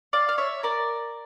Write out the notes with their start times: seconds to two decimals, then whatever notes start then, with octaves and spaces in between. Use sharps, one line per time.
0.13 D5 F5
0.29 F5
0.38 C#5 E5
0.63 A#4 D5